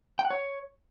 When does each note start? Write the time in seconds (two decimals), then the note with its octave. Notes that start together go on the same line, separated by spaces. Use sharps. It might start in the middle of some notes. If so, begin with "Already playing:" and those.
0.19 G5
0.25 F#5
0.30 C#5